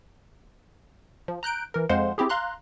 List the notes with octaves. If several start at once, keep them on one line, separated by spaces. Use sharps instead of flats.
F3
A#5 F#6 G6 D7
E3 A#4
F2 G#3 C5 F5 F#5 C6
C4 E4 G4 G#4
F5 A#5 C6 F#6